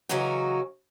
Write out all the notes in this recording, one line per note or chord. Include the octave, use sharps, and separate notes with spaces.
C#3 E3 F#3 C#4 D#4 F#4